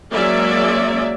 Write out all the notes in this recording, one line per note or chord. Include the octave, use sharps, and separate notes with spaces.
F#3 G#3 A#3 C#4 D5 E5